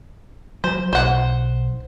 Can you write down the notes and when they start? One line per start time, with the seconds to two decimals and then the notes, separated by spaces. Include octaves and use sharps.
0.64 F#3 C5
0.93 B1 C5 F#5